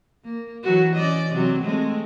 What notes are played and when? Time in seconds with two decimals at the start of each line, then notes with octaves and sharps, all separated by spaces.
0.24 A#3
0.63 E3 F#3 F#4
0.95 C#4 D5 D#5
1.33 C3 F#3 C4
1.64 G#3 A3 C4